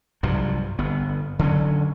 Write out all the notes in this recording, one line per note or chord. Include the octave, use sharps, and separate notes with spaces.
C2 G2 F3 F#3
G1 B3
D3 F#3 C#4